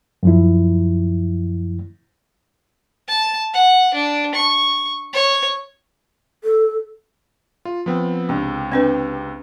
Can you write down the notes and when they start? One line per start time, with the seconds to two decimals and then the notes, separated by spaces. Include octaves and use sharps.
0.23 F#2 F3 E4
3.08 A5
3.54 F#5
3.94 D4
4.35 C#6
5.13 C#5
6.44 A4
7.65 F4
7.86 F3 B3 C4
8.29 C#2 C3 D4
8.72 C4 D4 B4